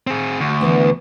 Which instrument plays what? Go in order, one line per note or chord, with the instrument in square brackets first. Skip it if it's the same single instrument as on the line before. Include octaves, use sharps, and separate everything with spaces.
[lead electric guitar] C4 G#4
D2
[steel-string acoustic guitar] E3 B3 D4